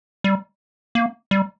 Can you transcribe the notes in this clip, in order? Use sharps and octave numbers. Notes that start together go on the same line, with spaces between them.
G3
A#3
G3